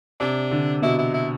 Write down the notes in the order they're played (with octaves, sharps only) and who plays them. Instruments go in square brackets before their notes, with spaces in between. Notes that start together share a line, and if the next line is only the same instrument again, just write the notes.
[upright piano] C3 [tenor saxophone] D4
[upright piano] D3
[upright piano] B2 [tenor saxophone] E4
[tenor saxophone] E4
E4